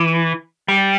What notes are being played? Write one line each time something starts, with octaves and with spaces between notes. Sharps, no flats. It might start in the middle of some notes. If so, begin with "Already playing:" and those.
Already playing: E3
G3